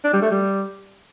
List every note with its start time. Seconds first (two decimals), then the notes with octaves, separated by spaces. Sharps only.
0.04 D4
0.13 G3
0.22 A3
0.31 G3